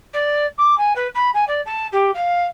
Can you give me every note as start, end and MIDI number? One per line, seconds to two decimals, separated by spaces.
0.13 0.46 74
0.58 0.77 86
0.78 0.93 80
0.95 1.07 71
1.14 1.30 83
1.34 1.44 80
1.47 1.61 74
1.66 1.87 81
1.92 2.11 67
2.14 2.46 77